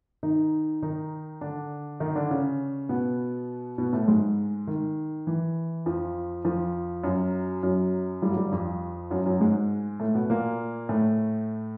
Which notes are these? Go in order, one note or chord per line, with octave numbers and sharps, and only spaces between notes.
D#3 D#4
D#3 D#4
D3 D4
D#3 D#4
D3 D4
C#3 C#4
B2 B3
B2 B3
A2 A3
G#2 G#3
D#3
E3
F2 F3
F2 F3
F#2 F#3
F#2 F#3
G2 G3
F#3
G2 G3
F2 F3
F#2 F#3
F#2 F#3
G#2 G#3
A2 A3
B2 B3
A#2 A#3
A2 A3